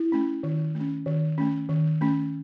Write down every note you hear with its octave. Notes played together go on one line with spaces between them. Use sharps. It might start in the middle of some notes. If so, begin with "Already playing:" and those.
Already playing: E4
A3 C#4
D#3
A3 C#4
D#3
A3 C#4
D#3
A3 C#4